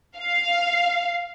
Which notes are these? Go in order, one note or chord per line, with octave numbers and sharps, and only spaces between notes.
F5